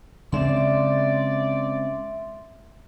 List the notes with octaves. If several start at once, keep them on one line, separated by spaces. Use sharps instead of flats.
C#3 G#3 C4 D5 E5 C6